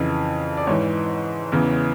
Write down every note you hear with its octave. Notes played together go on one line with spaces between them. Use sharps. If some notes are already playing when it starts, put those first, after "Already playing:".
Already playing: F2 C#3 E3
D5
G#2 E3 C#5
E2 C#3 E3